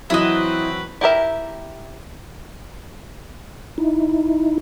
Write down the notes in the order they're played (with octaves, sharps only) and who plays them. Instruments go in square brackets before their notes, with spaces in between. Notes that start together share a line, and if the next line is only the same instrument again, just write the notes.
[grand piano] E3 F#3 [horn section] C4 F#4 B4 [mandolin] E4 D#5
[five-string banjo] E4 G4 A#4 E5
[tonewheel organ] D#4 E4